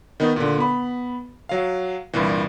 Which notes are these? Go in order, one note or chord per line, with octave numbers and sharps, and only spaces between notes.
D#3 B3 D#4
A#2 D3
B3 B5
F#3 F5
C2 G2 A#2 E3